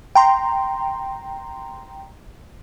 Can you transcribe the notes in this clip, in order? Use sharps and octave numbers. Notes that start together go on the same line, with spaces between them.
G5 A#5 C6